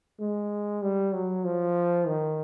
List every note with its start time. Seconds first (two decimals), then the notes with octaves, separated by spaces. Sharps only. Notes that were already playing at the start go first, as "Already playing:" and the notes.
0.20 G#3
0.82 G3
1.13 F#3
1.45 F3
2.07 D#3